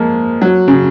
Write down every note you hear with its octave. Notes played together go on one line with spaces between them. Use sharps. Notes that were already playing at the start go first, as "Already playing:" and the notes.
Already playing: F3 G#3 A#3
F#3
C#3